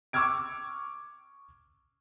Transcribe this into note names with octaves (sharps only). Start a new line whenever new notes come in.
C#6 D6 E6 F6 G#6 D7